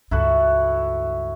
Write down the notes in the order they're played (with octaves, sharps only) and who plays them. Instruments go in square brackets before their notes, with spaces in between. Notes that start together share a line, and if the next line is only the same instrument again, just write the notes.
[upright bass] C#2 G2 [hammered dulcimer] E4 F#4 A4